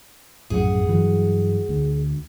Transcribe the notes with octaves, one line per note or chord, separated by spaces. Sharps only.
A#1 F#2 A2 G#4 F#5
G2 E3 F#3
D2